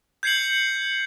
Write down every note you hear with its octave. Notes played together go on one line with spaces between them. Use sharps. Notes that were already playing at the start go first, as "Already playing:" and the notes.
G6 G#6 C7 C#7 F#7